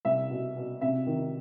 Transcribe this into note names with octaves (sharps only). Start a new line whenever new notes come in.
C2 E5
B2
B2
C3 E5
D#3